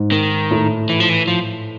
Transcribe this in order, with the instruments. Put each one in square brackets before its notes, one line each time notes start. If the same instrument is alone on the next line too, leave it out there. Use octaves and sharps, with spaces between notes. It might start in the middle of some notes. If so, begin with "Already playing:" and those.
Already playing: [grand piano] G#2
[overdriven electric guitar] D#3
[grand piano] A2
[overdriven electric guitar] E3
F3
E3
F3